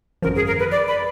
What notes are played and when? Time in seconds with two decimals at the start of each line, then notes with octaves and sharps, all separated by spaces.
0.22 G#1 F#2 F3 A#4
0.36 G#4
0.47 A#4
0.59 B4
0.71 D5
0.88 B5